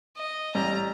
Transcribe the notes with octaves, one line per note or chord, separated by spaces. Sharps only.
D#5
A1 G3 A#5